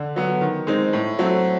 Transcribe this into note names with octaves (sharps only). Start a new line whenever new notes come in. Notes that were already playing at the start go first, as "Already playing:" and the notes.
Already playing: D3
F#3 B3
D#3
G#3 C4 D#4
A2
F#3 A3 C4